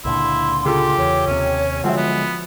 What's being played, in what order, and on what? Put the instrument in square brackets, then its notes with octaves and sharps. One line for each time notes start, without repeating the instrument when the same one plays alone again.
[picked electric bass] C#2 A#2 D3 [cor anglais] E4 [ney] C6
[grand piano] C#3 F4 A4 [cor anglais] G4
[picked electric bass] E2 [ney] C#5
[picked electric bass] D#2 C3 [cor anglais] C#4
[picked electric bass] D3 F#3 G#3 [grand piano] F3 F#4 E5 [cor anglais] C4
[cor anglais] B3